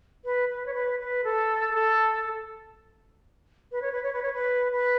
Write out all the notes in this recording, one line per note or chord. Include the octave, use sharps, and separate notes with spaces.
B4
B4
C#5
B4
B4
A4
A4
B4
C#5
B4
C#5
B4
C#5
B4
B4